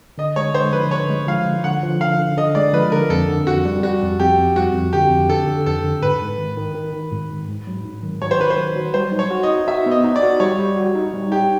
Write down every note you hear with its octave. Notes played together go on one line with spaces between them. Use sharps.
D3 D#5
G#3 C#5
D3 C5
F3 B4
D3 C#5
G#3
F3 F5
D3
D3 F#5
F3
D3 F5
D3
D3 D#5
G#3 D5
F3 B4
D3 A#4
F2 A4
D3
F2 F#4
G3
G3 F#4
F2
F2 G4
F2
G3 F#4
F2
D3 G4
F2
D3 A4
D3
F2 A4
D3
G#2 B4
G#2
D#3
D#3
D#3
D#3
G#2
G#2
G#2
F#3
G#2
D#3
F#3 C#5
C5
D#3 B4
C5
F#3
F#3
G3 C5
D#4
C#5
F#4
D#5
D#4
F#4 E5
B3
D#5
D#4
D5
F#4
G3 C#5
G3
F#4
D#4
G3
D#4 G4